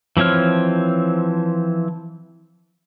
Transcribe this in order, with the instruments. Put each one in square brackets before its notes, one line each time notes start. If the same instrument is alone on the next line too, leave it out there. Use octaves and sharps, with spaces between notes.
[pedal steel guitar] E3 F3 C4 C#5 F6